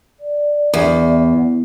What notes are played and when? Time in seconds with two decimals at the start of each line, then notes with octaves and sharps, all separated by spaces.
0.20 D5
0.74 E2